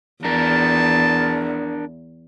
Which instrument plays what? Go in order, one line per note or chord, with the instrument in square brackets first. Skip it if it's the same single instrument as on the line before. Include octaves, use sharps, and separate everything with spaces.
[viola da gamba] E2 [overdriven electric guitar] D4 A#4 [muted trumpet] A5